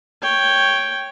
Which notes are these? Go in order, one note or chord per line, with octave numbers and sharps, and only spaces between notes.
C#5 G5